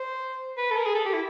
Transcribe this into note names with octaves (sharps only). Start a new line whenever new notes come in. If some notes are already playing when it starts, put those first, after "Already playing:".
Already playing: C5
B4
A4
A#4
G#4
A4
G4
E4